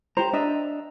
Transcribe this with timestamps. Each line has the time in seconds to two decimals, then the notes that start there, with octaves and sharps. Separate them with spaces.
0.17 G4 C5 A#5
0.33 D4 D#5 E5